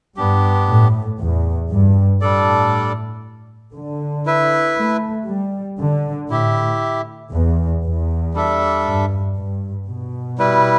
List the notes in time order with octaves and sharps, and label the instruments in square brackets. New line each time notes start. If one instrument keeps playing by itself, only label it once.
[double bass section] G2 [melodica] B3 D4 G4
[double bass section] A2
E2
G2
[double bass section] A2 [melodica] G3 D4 A4 D5
[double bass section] D3
[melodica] E4 B4 E5
[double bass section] A3
G3
D3
[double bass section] A2 [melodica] E4 G4 E5
[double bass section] E2
E2
[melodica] G3 D4 A4 E5
[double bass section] G2
G2
B2
[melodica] G3 E4 B4